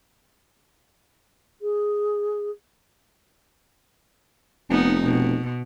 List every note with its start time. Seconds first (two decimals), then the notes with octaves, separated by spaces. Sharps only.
1.61 G#4
4.70 F1 B3 D#4
5.04 B2